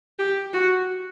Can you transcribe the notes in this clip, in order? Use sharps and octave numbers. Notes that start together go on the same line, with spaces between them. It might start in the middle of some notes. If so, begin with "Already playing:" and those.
G4
F#4